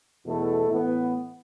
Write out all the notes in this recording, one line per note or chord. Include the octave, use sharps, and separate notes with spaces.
E2 B2 A3 E4 A4
A2 E3 B3